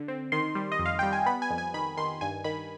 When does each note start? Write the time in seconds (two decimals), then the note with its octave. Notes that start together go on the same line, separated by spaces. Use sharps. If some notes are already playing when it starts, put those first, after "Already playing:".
Already playing: D3
0.08 C4
0.32 D#3 C6
0.55 G3
0.72 D#5
0.79 F2
0.86 F5
0.99 G3 G5
1.13 G#5
1.26 B3 B5
1.42 G#5
1.50 F2
1.58 G#5
1.74 D#3 B5
1.97 D#3 C6
2.21 G2 G#5
2.44 D#3 B5